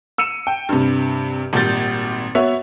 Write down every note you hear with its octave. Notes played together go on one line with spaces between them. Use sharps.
E6 C#7 D#7 E7
G5
G2 C3
G#1 A#2 G3 G6 A6
B3 F#4 C#5 E5